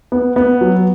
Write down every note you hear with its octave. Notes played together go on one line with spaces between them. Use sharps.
B3
B3
F#3